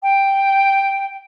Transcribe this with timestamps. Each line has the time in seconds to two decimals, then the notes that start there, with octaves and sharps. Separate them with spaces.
0.02 G5